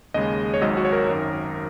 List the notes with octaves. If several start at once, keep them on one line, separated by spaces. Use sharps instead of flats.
D#2 C#3 G#3 D#5
C#5
G#1 G#2 F#3 D#5
F#4
C#5
A#4
G#1 F#2 D#3